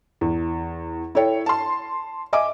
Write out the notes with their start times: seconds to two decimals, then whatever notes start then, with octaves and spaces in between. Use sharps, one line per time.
0.21 E2
1.15 E4 A4 C#5 G5
1.46 A5 C6
2.33 D#5 E5 G#5 D6